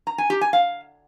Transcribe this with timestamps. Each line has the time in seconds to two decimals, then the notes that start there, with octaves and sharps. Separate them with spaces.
0.07 A#5
0.18 G#5
0.30 G4
0.41 G#5
0.53 F5